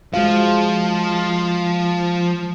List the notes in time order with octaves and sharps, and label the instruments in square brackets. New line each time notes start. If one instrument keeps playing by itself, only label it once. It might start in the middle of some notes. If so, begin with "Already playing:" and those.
[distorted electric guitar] F3 [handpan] G#3 F#4 F5